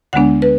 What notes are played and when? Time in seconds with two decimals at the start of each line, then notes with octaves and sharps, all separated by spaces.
0.13 D2 D3 G#3 B3 D4 F#5
0.42 B4